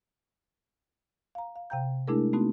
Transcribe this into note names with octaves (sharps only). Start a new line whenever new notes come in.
F5 A#5
F5
C3 F5 G5 A#5 G6
G#3 A3 D4 E4 G#4 A#4
A3 B3 C4 D#4 F#4